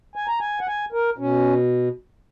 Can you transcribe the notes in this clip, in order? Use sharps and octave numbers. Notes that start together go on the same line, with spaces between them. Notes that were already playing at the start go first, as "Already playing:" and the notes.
G#5
A#5
G#5
F#5
G#5
A#4
B2 C#4